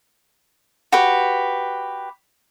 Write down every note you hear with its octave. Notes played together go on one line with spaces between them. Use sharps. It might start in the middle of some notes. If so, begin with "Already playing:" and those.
F#4 G4 B4